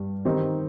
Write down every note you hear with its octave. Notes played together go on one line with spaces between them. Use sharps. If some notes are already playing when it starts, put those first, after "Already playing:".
Already playing: G2 G3
D#3 C4 D#4 G4